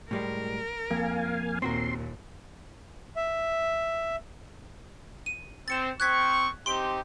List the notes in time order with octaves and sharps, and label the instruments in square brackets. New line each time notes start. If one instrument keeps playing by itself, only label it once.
[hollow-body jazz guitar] A2 G3 G#3 [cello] A#4
[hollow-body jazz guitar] F2 [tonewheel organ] A#3 F5 G#5
[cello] D#2 A#2 [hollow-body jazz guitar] C4 F#4 A#4 [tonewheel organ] C6
[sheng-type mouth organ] E5
[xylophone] D#7
[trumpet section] C4 [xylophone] A6 C#7 E7
[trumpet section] C4 C#6 [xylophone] F#6 G#6 B6
[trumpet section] C4 D#4 G4 [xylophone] C6 D7 G7